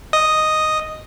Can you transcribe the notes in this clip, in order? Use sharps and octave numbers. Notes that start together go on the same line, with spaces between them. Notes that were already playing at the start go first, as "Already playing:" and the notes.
D#5 D#6